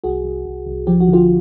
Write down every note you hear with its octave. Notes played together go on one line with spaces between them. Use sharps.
C2 F#4 G#4
C2
C2
C2
F3 G4
F#4
D3
F4 G4